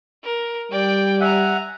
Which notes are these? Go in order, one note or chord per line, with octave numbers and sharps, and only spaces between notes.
A#4
G3 D5 G5
E5 F#5 G#5 A#5